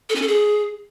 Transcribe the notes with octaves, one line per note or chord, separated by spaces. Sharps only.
A4
C#4
A4
G#4